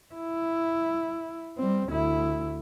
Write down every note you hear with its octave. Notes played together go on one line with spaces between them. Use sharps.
E4
G3 C4
D2 E4